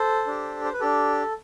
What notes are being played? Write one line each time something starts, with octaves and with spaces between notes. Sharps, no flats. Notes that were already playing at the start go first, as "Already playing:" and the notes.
Already playing: A4 C5
D4 G4
C5
B4
D4 G4 A4